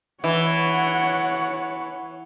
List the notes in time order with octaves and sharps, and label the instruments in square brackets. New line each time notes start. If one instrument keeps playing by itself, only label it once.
[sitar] E3 [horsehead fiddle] C#5 F#5